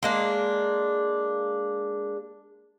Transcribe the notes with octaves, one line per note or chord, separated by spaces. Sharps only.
G#3 A#3 D4